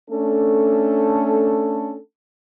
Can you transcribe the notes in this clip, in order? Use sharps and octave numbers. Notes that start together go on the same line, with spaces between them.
A3 C#4 D4 A4